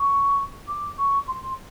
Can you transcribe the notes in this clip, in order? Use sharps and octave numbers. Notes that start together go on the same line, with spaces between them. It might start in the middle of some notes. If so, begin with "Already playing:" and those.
Already playing: C#6
D6
C#6
C6